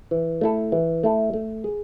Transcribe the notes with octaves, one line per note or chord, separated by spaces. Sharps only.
E3
A3 E4 A4
E3
A3 E4 A4
A3
G#4